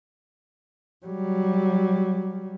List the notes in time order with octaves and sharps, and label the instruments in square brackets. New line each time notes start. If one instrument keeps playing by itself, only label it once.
[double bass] F#3 G3